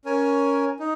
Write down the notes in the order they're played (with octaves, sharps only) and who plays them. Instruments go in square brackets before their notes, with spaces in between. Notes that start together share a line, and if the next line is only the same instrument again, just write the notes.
[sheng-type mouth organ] C#4 A#4 C#5 G#5
D#4